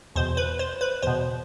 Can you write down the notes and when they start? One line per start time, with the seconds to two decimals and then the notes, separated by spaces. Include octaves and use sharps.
0.15 E2 B2 C5
0.37 B4
0.59 C5
0.81 B4
1.02 E2 B2 C5